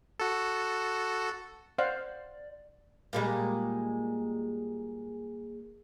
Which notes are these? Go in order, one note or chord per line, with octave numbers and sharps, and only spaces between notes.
F#4 A4
C5 D5 F5 F#5
A#2 G3 G#3